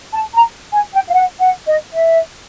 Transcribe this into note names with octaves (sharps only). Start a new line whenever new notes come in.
A5
A#5
G#5
G5
F5
F#5
F#5
D#5
E5